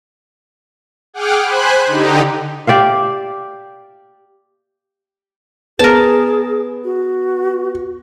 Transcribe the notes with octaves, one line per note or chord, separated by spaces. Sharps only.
G#4 F#5 G5 D6 F6
C5 G#5 B5 F#6
D3 D#4 G4
G4 D5 E5 F5
B3 G#4 A#4 A5
F#4